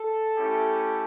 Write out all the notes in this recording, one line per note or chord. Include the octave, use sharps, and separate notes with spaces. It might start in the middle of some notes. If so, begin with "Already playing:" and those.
Already playing: A4
A3 C#4 E4 G4